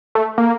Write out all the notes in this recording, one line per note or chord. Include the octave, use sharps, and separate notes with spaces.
A3
A#3